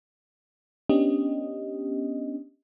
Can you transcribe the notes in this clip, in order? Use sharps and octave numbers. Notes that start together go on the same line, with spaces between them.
B3 C#4 D4 G4 D#5